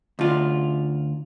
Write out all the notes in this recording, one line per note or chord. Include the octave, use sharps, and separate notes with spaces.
D2 F4